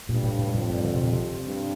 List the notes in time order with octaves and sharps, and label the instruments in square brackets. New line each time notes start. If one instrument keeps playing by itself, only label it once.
[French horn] G2 [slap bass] A#2
[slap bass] A2
A2
[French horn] F2 [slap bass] A2
[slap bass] G2
D3
C3
A#2
C3
[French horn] G2